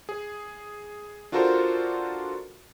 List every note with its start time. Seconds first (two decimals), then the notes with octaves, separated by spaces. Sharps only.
0.09 G#4
1.32 D4 F4 F#4 A4 A#4 C5